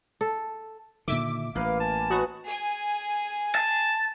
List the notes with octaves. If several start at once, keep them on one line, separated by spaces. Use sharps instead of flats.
A4
A#2 D3 D#3 E5 D6
A1 A#3 B4 F5
G#5 A5
D#4 F#4 B4 C#5
G#4 G#5
A5